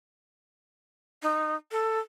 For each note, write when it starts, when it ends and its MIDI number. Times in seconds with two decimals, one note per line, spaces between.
1.22 1.55 63
1.71 1.99 69